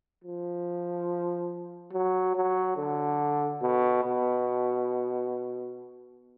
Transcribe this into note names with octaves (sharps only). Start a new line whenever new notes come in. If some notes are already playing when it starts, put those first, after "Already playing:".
F3
F#3
F#3
D3
B2
B2